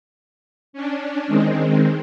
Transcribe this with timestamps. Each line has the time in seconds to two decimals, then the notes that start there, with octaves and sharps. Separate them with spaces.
0.73 C#4 D4
1.28 D#3 G#3 C4